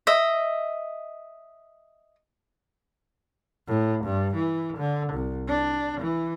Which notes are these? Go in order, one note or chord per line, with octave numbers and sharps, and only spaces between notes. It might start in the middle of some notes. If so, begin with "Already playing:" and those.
D#5 E5
A2
G2
E3
D3
C2
D4
E3